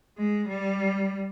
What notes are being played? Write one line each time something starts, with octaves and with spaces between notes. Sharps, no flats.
G#3
G3